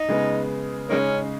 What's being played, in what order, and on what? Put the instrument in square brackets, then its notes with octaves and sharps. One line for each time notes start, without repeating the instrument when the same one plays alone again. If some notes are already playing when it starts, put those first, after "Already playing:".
Already playing: [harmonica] D#4
[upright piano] C#3 G#3 B3
[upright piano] C#3 G#3 D#4 [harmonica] A#3 C#4